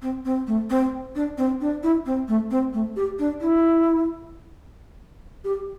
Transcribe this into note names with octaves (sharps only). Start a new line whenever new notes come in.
C4
C4
A3
C4
D4
C4
D4
E4
C4
A3
C4
A3
G4
D4
E4
G4